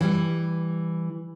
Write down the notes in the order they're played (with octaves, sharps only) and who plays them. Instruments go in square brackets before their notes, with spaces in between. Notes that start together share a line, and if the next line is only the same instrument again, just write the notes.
[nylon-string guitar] E3 G3